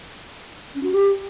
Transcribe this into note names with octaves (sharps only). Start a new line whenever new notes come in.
C#4
F#4
G4